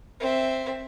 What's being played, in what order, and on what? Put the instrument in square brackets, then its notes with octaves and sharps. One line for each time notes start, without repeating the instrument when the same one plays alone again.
[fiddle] C4 E5